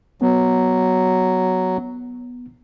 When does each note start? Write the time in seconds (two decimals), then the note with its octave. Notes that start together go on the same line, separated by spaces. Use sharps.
0.22 F#3 B3